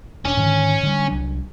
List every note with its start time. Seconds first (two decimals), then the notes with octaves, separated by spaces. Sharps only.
0.25 E1 C#4 D4
0.37 G#2 D3 D#3
0.83 D3 G3
1.08 C2 F#3 D4